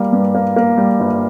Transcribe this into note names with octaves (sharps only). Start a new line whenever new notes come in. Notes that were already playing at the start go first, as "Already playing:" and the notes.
Already playing: G3 A#3
G2
A#3
A#3
G3
G1